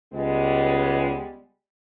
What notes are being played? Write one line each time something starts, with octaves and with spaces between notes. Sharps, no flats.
C#2 G3 G#3 B3